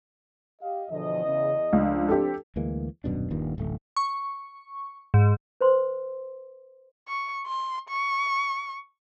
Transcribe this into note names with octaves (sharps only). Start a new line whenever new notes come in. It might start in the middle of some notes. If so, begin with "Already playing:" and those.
G4 D#5 F5
E2 B2 D3 F3 D#5
C#3
C#2 F3 A3 D4
C4 G4 A4
D2 E3 G#3 A#3
D#1 F#2 B2 D4
D#1 G2 A#2 D#3
D1 A1 A3
C#6
G#2
B4 C5 C6
C#6
C6
C#6